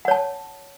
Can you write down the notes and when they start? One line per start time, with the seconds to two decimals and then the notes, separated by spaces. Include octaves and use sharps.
0.05 F#5
0.08 C#5
0.11 A5